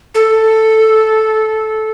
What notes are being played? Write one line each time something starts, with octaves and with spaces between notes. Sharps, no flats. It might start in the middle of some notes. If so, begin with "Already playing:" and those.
A4